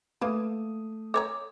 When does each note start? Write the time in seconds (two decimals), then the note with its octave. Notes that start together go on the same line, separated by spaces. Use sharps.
0.21 A3 A#3 B4 D#6
1.14 A4 C#5 A#5 D6